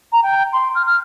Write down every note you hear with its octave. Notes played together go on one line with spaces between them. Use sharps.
A#5
G5
C6
F6
F6